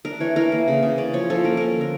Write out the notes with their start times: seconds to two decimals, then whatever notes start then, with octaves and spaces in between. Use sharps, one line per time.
0.05 D4 A#4
0.20 E3 C#5
0.36 E3 A#4
0.52 A#3
0.68 C#3
0.82 C#3
0.98 C#4 D5
1.13 F3 C#5
1.30 F3 A4
1.45 A#3 A#4
1.57 C#4 A#4
1.76 D3 A#4